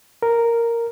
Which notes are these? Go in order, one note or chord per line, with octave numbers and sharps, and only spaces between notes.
A#4